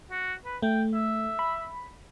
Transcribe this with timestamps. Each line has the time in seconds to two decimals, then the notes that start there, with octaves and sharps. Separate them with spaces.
0.11 F#4
0.45 B4
0.63 A3 G5
0.94 E5
1.39 B5